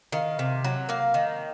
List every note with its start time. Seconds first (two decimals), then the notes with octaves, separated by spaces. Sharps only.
0.12 D#3 F5
0.39 C3
0.64 F#3
0.89 A#3 F5
1.14 D#3